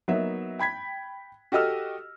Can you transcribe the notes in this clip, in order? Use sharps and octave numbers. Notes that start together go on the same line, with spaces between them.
F#3 A#3 B3 D#4 E5
G5 B5 G#6 B6
F#4 G4 A4 D#5 E6 F6